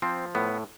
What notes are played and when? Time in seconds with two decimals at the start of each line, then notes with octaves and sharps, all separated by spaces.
0.02 F3 C4
0.35 A2 B3